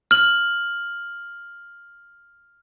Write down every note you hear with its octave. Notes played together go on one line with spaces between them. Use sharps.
F6 F#7